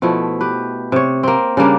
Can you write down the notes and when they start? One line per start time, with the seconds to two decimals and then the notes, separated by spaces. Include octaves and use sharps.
0.02 B2 F3 A3 E4
0.41 G4 B4
0.92 C3 C#5
1.23 A#3 C4
1.57 C#3 G3 A#3 D4